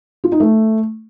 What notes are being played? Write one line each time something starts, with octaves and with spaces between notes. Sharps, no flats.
F4
D#4
A3